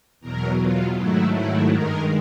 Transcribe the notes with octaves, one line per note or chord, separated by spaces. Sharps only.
E2 B2 F#3 A#4
F4
G#2 D#3 F#3 A3 E4
E4
G2 D#3 G#3 A#4